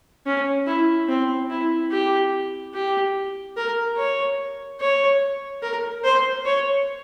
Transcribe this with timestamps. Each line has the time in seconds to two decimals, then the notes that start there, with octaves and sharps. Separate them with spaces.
0.26 C#4
0.67 E4
1.09 C4
1.50 E4
1.92 G4
2.74 G4
3.57 A#4
3.97 C#5
4.81 C#5
5.62 A#4
6.04 C5
6.45 C#5